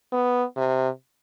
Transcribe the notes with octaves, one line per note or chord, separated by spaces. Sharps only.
B3
C3